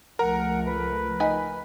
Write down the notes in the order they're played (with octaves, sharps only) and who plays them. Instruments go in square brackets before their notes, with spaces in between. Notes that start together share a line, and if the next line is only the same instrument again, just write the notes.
[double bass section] C#2 F3 A3 [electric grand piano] A#4 A#5 [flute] F#5
[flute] B4
[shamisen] D#4 F#5 G#5